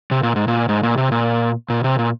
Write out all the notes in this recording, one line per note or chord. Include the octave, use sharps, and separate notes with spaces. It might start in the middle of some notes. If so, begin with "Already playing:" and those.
C3
A#2
G#2
A#2
G#2
A#2
C3
A#2
A#2
C3
A#2